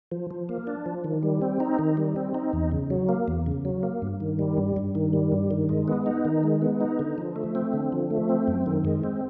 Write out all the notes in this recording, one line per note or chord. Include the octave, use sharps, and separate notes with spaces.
F3
F3
A#3
D4
F3
D#3
G3
C4
D#4
D#3
G3
C4
D#4
E2
C#3
F#3
A#3
E2
C#3
F#3
A#3
G2
D#3
G3
G2
G2
D#3
G3
G2
D#3
G#3
B3
D#4
D#3
G#3
B3
D#4
D3
F3
A3
C4
D3
F3
A3
C4
F#2
D#3
G#3
C4